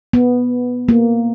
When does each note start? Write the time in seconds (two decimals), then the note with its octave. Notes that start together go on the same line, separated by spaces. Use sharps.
0.13 B3
0.89 A#3